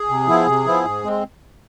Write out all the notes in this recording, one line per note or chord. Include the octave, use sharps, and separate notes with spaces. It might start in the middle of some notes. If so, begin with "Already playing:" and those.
Already playing: G#4
C3
F3 B3 E4
C3
F3 B3 E4
G#2
G#3 C4